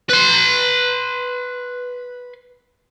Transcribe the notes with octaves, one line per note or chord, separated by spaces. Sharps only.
B4 C6